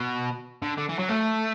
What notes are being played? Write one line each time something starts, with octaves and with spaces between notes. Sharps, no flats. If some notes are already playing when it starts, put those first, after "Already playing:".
Already playing: B2
D3
D3
E3
F#3
A3